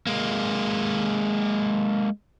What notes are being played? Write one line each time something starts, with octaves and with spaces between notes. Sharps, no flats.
G#3 A#3